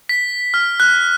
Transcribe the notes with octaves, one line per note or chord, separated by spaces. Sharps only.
B6
F6
F#6